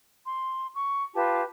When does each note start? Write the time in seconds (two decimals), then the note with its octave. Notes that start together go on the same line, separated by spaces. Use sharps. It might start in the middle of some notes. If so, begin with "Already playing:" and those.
0.25 C6
0.74 C#6
1.14 F4 G4 B4 A5